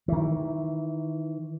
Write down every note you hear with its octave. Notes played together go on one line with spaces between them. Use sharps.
D#3 E3